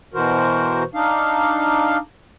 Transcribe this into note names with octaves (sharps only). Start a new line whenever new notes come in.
B2 E3 F#4 A#4 C5
D4 D#4 F5